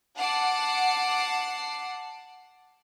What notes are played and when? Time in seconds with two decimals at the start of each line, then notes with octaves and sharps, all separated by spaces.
0.19 F#5 A5 D6 C7